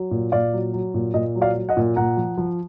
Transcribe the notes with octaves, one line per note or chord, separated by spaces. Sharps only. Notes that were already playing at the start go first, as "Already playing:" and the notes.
Already playing: F#3
A#2
A#2 D5 F5
F#3
F#3
A#2
A#2 D#5
F#3
D5 F5
F#3
D#5 F#5
A#2
A#2 F#5 A#5
F3
F3